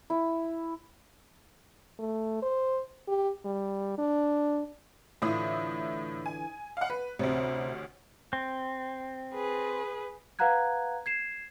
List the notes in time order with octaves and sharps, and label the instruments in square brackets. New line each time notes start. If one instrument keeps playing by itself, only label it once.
[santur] E4
[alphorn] A3
C5
G4
G3
D4
[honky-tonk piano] A2 E4 D#6 [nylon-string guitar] D3 E3 F4
[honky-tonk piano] G#5
F5 F#5
B4
[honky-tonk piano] A1 D2 [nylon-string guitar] C3
[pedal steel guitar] C4
[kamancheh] G#4 B4
[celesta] B4 F5 F#5 A#5 F#6 G#6
G#6 C7 E7